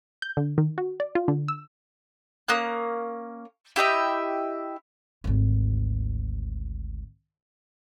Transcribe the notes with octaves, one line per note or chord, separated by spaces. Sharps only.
G6
D3
D#3
F#4
D5
F4
D3
E6
A#3 C#4 D#6 F#6
E4 G4 D#5 E5
G#1 D2